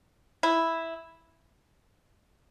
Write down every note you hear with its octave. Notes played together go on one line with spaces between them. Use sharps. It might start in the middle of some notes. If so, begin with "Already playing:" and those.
E4